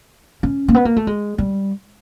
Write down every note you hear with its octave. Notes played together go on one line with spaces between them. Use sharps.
C#4
A#3
B3
A#3
A3
G#3
G3